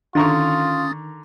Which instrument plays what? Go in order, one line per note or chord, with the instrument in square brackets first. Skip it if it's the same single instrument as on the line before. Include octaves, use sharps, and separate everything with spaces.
[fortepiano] D3 A#5 C#6 [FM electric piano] D#3 [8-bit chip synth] C#4 D#6 A6 [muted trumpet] F4